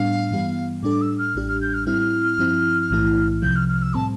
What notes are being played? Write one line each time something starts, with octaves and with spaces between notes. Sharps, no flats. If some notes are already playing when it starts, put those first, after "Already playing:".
Already playing: A2 G3 B3 D4 F5
G2 E3 G3 B3
A2 G3 D4 A4 D6
E6
F6
A1 A2 G3 D4 G4
F6
G6
F6
A2 G3 C4 E4 F6
G2 F3 C4 E4
B1 A2 E3 A3 E4
C2 C3 F3 G6
F6
F6
E6
A2 G3 C4 A5